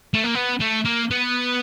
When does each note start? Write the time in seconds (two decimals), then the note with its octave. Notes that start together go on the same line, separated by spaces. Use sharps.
0.14 A3
0.24 A#3
0.35 B3
0.60 A3
0.85 A#3
1.11 B3